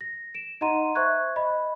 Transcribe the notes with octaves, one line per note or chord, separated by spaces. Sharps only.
A#6
D7 E7
D#4 D#5 F#5 A#5 C6 D#7
C5 E5 C#6 F#6 G#6
D#5 B5